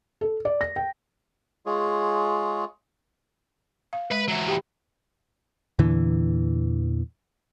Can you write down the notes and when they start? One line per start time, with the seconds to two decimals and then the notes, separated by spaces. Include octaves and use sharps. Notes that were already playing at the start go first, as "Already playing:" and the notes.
0.21 A4
0.45 D5
0.61 A#6
0.76 G5
1.66 G#3 F4 G#4 C#5
3.93 F5
4.11 G#3 B4 B5
4.29 E3 F#3
4.48 G4 G5 B5
5.79 E2 A#2 D3 E3